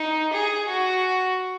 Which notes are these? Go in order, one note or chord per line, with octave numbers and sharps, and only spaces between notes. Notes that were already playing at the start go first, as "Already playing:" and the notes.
Already playing: D#4
G#4
F#4